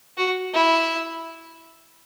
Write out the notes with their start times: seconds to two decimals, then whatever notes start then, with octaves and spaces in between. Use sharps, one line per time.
0.17 F#4
0.54 E4